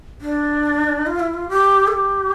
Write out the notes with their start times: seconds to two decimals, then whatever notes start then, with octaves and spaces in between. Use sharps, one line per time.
0.21 D4
1.07 F4
1.20 E4
1.34 F4
1.49 G4
1.88 A4
1.92 G4